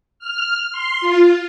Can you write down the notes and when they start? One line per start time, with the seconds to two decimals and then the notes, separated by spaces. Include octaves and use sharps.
0.19 F6
0.72 C6
1.01 F4